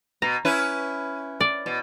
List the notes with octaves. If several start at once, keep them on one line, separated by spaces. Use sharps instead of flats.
B2 A#5
C#4 E4 B4
D5
B2